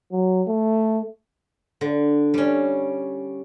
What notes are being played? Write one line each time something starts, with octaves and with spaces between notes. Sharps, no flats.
F#3
A3
D3
G3 C#4